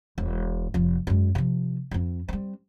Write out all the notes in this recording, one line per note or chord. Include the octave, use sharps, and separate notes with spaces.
E1
F1 F3
F#2 G#3
C3 F3
F2 C4
G3 C4